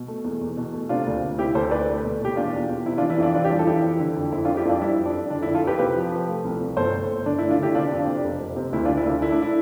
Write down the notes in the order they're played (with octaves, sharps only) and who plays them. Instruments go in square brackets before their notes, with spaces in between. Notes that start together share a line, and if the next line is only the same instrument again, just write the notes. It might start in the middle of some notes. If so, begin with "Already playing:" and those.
Already playing: [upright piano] B2
A3
E2
E2
B2
A3
C3 D4 F4
D2
D2
C3 E4 G4
D2 A4 C5
D2 B4 D5
A3
B2
B2 G4
E2 D4 F4
E2
E2
C3 E4
D4 F4
E3
E4
F2 D4 F4
E3 D4 F4
G4
G3 D4 F4
A4
E3 E4 G4
F2
D3
F2
F2 E4
D4 F4
F2
E4 G4
F2 D4 F4
G3 E4
F2
D4
F2
D3 D4
E4
F2
F4 A4
F2 G4 B4
C3 G4 B4
F3
F3
A3
C2
C2
G1 A4 C5
A3
G1
D3 D4
E4
A3
D4 F4
D3 E4 G4
C3 D4 F4
F2
D4
C3
F1
F1
C3
D2 E4
D4 F4
D2
E4
D2 D4
A3 E4
D4
E4